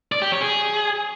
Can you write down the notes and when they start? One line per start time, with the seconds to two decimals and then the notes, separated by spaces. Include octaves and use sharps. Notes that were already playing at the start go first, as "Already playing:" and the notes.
0.12 D5
0.22 G4
0.32 C#5
0.42 G#4